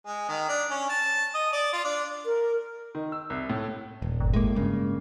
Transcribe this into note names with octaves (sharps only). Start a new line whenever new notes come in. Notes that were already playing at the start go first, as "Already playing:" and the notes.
G#3
D#3
D4
C#4
A5
D#5
D5
F4
D4
A#4
D#3
E6
C2
A2
D#1
G1
A2 G#3 A#3
G2 C#3 A#3